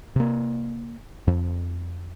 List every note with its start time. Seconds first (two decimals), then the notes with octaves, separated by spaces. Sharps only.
0.16 C3 A#3
1.27 F2